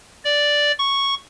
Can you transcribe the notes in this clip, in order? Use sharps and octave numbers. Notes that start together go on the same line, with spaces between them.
D5
C#6